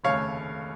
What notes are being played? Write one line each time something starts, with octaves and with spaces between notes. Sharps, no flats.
F1 D#2 C#3 A3 C#5 F5